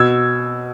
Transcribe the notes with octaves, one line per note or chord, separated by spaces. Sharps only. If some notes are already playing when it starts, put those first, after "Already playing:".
Already playing: B2 E6 G#6